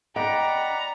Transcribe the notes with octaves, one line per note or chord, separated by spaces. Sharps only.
D5 D#5 F#5 G5 A#5 B5